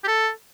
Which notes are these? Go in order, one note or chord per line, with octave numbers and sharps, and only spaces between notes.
G4
A4